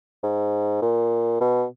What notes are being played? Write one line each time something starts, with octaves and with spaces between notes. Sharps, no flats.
G#2
A#2
B2